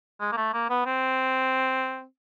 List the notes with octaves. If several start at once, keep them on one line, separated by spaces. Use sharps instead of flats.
G#3
A#3
A3
A#3
B3
C4